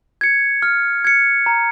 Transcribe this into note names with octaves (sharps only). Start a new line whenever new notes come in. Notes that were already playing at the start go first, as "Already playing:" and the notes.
G#6 C#7
F6
G#6 C#7
A#5